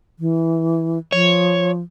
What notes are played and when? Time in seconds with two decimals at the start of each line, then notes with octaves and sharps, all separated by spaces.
0.19 E3
1.12 F3 C#5